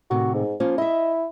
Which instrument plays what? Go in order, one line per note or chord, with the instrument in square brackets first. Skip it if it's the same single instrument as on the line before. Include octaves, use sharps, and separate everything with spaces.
[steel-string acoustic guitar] A2 C3 D#3 [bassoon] F#4
[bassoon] G#2
[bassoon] F3 [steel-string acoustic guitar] A#3 C#4 F4
[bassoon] E4 [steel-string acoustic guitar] D#5 E5